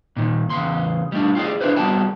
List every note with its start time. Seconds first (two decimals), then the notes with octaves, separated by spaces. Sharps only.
0.16 A#2 D#3
0.50 E2 C#3 C6
1.12 G3 A3 D4
1.35 F4 G4 G#4 D5
1.61 D4 E4 F4 B4 C5
1.76 G3 B3 F#4 D5 G5 A5